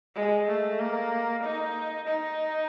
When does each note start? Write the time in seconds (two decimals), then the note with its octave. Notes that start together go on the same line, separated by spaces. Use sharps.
0.15 G#3
0.47 A3
0.79 A#3
1.43 D#4
2.07 D#4